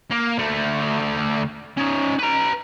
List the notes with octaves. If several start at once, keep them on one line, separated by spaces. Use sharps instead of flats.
A#3
D3 A3
C#4 D#4
B4 A#5